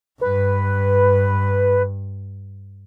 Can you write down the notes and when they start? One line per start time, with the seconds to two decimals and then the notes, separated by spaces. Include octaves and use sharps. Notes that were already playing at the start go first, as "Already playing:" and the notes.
0.21 G2 B4